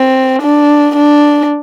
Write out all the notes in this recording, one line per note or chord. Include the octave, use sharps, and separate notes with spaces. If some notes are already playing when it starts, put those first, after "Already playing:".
Already playing: C4
D4
D4